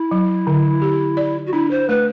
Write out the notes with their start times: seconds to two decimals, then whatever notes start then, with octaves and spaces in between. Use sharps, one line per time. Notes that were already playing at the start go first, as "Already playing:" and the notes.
Already playing: E4
0.11 F#3
0.47 D3
0.82 G4
1.17 D5
1.46 F#4
1.53 D4 E4
1.71 C5
1.89 A3 B4